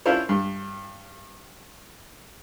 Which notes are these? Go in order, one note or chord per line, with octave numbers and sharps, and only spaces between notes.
C#4 D4 E4 F4 C5 C#5
G2